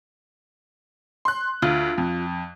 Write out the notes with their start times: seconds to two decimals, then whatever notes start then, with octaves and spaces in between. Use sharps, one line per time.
1.25 C6 F#6
1.62 D2 F4
1.98 F2